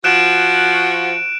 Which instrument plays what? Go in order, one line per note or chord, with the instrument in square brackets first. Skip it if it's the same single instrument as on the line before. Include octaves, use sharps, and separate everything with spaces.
[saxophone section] F3 F#4 [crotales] F#6 D7 E7